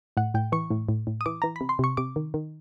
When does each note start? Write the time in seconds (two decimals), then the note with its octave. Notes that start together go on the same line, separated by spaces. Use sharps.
0.17 A2 F#5
0.34 A2 G5
0.52 E3 C#6
0.70 A2
0.89 A2
1.07 A2
1.21 D#6
1.26 E3 D6
1.42 E3 A#5
1.56 B5
1.61 C3
1.69 C6
1.79 C3 C#6
1.97 C3 D6
2.16 D#3
2.34 D#3